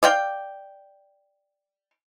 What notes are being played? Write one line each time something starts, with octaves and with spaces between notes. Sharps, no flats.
D5 F5 G5